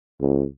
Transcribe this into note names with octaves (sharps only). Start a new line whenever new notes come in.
C#2